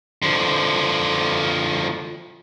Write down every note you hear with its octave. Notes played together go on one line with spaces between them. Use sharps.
D3 F3